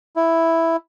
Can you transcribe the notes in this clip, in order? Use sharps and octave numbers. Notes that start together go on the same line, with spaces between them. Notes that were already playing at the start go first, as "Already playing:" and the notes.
E4